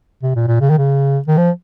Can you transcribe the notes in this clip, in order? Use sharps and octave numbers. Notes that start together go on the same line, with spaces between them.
C3
A#2
A#2
C#3
D#3
C#3
D#3
F3